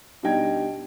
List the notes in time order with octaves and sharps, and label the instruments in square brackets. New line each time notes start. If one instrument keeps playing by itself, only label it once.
[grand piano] B2 G3 D4 D#4 G5 G#6